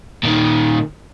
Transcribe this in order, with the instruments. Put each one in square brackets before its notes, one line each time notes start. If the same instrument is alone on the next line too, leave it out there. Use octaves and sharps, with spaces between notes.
[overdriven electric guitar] A#2 D#3